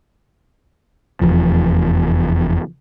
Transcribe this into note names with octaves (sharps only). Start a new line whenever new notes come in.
F1 E2 F3